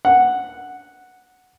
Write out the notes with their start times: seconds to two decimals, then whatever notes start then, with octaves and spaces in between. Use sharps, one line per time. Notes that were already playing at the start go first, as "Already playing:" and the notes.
0.05 F#5